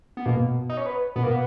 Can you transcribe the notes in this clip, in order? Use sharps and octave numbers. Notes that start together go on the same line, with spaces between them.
B3
B2 A#3
D#4
C#4
B3
B2 B3
A#3
B3